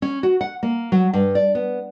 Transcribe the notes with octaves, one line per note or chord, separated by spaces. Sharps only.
C#4
F#4
F#5
A#3
F#3
G2
D5
B3